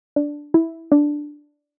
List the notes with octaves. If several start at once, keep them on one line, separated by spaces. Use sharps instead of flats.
D4
E4
D4